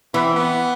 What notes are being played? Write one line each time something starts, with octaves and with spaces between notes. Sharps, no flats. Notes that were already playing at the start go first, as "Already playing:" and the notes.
E3 B3
C4
B3